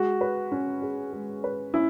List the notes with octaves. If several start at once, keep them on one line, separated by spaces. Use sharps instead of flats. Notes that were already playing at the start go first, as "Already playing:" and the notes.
Already playing: G#3 F#4
B4
C#4
G#4
G#3
B4
C#4 E4